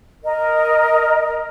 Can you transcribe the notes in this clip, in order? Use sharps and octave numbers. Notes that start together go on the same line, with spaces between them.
A#4 D#5